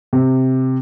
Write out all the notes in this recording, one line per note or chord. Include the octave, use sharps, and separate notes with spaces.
C3